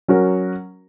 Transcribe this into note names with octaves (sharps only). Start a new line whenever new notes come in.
F#3 C#4 F#4 A#4